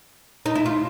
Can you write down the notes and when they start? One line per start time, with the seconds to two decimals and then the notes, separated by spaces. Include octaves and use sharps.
0.46 D#4
0.55 E4
0.66 F4